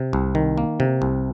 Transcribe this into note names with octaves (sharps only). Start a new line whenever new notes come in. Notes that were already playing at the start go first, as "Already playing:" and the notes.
Already playing: C3
C2
D#3
A#3
C3
C2